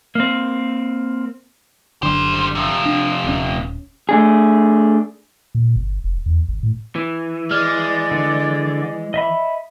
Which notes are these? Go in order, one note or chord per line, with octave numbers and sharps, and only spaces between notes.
A#3 C4
F#1 F#2 D3 G3 C5
C3 F3
D4
D#1 G2 C#4
A3 D4 G#4
A#2
G1
F1
E2
G#1
A2
E3
G#3 D5 F6
D3
D#5 E5 B5